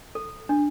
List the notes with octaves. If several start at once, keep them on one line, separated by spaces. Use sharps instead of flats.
A4
D4